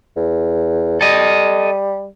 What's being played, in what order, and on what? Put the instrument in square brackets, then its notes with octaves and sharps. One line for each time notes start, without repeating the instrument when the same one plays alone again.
[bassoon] E2
[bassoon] G3 [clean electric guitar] A4 D#5